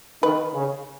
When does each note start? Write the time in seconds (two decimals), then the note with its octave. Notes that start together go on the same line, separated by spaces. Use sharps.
0.23 D#3 B4
0.54 C#3